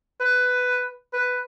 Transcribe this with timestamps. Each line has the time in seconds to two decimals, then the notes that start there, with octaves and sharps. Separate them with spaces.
0.20 B4
1.13 B4